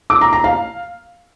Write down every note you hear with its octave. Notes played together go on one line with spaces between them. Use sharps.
D6
A#5
A#5
F5